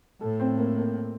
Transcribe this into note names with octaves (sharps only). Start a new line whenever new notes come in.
A2 A4
C4
A#3
A#3